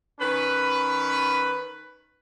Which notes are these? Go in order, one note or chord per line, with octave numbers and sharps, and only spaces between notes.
D#3 C#4 B4